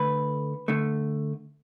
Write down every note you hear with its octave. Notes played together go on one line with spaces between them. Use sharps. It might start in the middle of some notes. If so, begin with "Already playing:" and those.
Already playing: D3 A3 B4
D3 A3